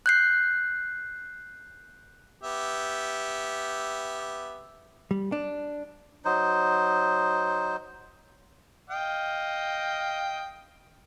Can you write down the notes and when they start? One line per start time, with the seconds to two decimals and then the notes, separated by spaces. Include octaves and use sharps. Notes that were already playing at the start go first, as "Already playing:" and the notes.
0.06 F#6 G6 C7
2.43 B3 G4 E5
5.11 G3
5.32 D4
6.25 F#3 D#4 C5
8.90 D#5 F5 G5